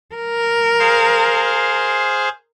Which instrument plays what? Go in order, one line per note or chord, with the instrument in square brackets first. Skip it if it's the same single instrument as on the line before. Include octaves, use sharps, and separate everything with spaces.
[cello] A#4
[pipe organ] G#4 C5 F5